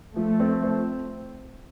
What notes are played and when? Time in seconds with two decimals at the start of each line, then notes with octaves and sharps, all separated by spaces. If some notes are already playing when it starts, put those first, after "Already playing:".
0.16 F3 A3
0.40 C4
0.64 C5